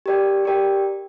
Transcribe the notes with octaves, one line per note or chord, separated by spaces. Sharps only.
G4 A#4 D5 G5
G4 A#4 D5 G5